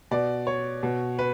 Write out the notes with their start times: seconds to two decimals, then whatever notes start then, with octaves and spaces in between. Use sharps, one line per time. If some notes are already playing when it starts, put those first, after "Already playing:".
0.11 B2 D5
0.47 C#5
0.83 B2
1.19 B4